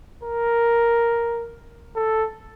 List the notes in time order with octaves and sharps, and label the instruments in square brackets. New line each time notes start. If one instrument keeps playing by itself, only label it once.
[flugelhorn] A#4
A4